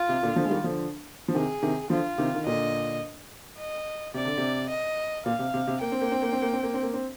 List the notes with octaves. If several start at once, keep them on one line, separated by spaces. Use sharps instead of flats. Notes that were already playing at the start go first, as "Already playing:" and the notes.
Already playing: F4
C3
A#2 D3
D3 F3
G#3
D#3 G3
D3 F3
F3
C3 D#3 G#4
C3 D#3
D3 F3 F4
C3 D#3
D#3
A#2 D3 D#5
D#5
C3 D5
D3
C3
D#5
A#2 F5
C3
C3
C3
A#3 G5
C4
A#3
C4
A#3
C4
A#3
C4
A#3
C4
A#3
C4